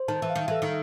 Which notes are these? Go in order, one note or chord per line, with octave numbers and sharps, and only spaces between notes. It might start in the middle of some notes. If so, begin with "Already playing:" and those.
Already playing: C5
D#3 A5
E3
F5
D#3
E3 A4
D#3